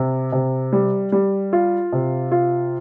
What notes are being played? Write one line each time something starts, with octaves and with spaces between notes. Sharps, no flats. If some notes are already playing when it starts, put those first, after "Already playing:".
Already playing: C3
C3
G3
G3
F4
C3
F4